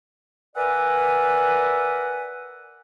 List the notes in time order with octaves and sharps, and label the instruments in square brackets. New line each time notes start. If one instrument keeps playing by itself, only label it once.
[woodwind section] A#4 B4 D5 E5 F#5 G#5